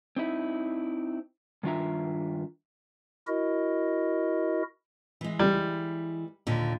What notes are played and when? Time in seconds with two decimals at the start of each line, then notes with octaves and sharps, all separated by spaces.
0.17 C4 D#4 E4
1.63 G2 D#3 D4 F4 E5 A#5
3.27 E4 F#4 A#4 D#5
5.21 E3 G#3
5.39 G3
6.47 D#2 A#2 D3